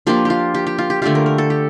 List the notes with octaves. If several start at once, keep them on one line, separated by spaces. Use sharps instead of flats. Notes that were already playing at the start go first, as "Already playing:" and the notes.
F3 A#3 D4 F4 G4
F4 G4
G4
G4
F4
G4
D3 A3 D4 F4 G4
A#4
A#4
A4
G4